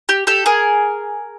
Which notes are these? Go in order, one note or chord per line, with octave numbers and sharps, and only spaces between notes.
G4
G4 A4
G#4 A#4